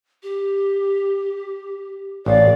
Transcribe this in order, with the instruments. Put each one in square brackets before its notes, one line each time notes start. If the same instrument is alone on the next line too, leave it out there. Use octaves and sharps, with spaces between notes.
[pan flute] G4
[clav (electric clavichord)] A1 [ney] D5 [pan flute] F5